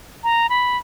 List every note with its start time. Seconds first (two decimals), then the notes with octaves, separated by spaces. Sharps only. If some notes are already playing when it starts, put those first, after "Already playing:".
0.24 A#5
0.50 B5